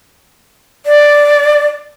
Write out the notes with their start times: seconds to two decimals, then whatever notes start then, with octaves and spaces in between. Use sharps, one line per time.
0.86 D5